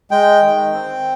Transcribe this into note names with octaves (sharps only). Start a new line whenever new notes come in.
G#3 G5
D#3
C4